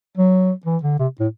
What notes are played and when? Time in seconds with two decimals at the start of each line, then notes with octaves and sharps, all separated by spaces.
0.17 F#3
0.66 E3
0.83 D3
0.99 C3
1.20 A2